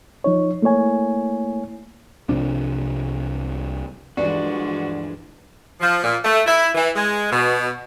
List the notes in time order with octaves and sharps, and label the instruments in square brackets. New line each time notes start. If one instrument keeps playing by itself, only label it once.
[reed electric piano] F3 D#4 C#5
A3 A#3 E4 C#5 G#5
[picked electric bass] C2 C3 F3 D4
[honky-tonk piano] D2 G2 E3 [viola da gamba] F3 G#3 D4 [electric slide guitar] F#4 [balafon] D5
[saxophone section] F3
A#2
A3
E4
E3
G#3
B2